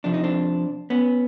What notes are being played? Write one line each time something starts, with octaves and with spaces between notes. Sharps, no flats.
F2 C3 F3 D4
D#4
C4 D4
B3 C#4